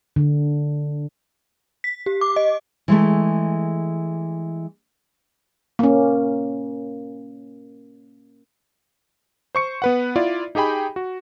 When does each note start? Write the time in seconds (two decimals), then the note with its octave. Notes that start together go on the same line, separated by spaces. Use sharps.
0.16 D3
1.84 B6
2.06 G4
2.21 D6
2.36 D#5
2.88 E3 G#3 A3
5.79 A#3 C#4
9.55 C5 C#6 C#7
9.82 B3 B4 F#5
10.16 E4 F4 D5
10.55 D#4 G4 G#4 G5 B5
10.96 F#4